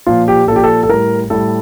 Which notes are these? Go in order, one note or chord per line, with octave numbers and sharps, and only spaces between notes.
A#2 F3 F4
G4
A#2 F3 G4 A4
A4
A4
A2 G3 A#4
A2 G3 A4